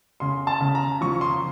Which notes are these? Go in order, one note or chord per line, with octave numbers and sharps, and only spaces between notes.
C#3 C6
A5
C#3
A#5
F3 C#6
C6